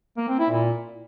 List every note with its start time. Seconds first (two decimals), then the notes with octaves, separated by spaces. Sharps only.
0.18 A#3
0.29 C4
0.39 E4
0.50 A#2